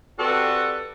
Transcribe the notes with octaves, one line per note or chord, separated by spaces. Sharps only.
C4 F#4 G4 A4 B4 D5